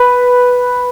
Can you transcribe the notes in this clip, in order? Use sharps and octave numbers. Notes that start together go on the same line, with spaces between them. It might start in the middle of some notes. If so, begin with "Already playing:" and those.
Already playing: B4